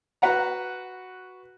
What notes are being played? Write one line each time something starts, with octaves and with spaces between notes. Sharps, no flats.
F#4 B4 F#5 A#5